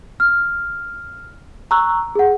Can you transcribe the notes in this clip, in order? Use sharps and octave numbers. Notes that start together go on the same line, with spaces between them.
F6
A#5 C#6 E6 F#6
G#4 F#5